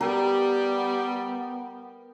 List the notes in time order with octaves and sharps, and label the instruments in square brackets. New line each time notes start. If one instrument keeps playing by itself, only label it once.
[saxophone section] G3 [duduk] B3 [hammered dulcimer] A#4 G5